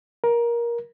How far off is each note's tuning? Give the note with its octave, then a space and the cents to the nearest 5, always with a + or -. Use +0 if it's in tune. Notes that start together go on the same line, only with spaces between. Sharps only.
A#4 +15